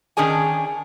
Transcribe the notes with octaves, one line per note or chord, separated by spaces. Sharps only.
D#3 C#4 D4 G#4 G#5